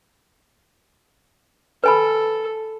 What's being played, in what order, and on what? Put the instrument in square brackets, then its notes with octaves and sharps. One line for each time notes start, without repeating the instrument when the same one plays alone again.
[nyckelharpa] A4 [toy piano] B4 G#5 B5